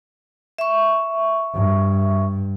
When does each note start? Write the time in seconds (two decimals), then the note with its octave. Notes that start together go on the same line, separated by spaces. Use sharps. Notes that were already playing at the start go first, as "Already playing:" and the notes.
0.58 E5 C#6
1.55 G2